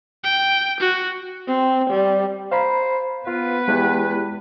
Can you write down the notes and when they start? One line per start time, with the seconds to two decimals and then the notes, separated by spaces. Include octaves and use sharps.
0.24 G5
0.80 F#4
1.47 C4
1.90 G3
2.52 C5 F5 A#5 B5
3.27 B3 F4 B4
3.68 E2 G#3 E4 G4